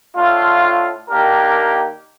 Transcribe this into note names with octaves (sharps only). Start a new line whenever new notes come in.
A2 A3 D4 F4
D#3 A#3 D4 G4 A#4